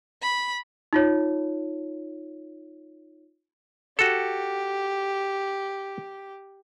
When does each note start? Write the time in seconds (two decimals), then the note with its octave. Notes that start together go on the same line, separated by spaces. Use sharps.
0.22 B5
0.93 D#4 F4 C#5
3.99 F#4 G4 A4